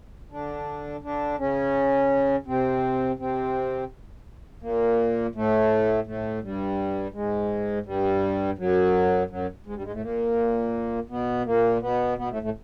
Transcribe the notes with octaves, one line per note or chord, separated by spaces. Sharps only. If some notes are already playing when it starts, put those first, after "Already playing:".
D3 D4
D3 D4
C#3 C#4
C3 C4
C3 C4
A#2 A#3
A2 A3
A2 A3
G2 G3
G#2 G#3
G2 G3
F#2 F#3
F#2 F#3
G#2 G#3
G2 G3
G#2 G#3
A2 A3
A#2 A#3
B2 B3
A#2 A#3
B2 B3
B2 B3
A2 A3
A2 A3